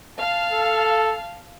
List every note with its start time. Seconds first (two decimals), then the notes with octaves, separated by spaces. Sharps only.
0.18 F5 A5
0.52 A4